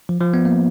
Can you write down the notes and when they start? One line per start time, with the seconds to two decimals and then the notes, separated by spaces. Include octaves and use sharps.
0.09 F3
0.21 F3
0.34 B3
0.45 A#3